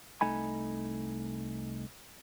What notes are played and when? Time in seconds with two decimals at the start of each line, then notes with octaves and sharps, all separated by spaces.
0.21 C2 A3 D#4 G#5 B5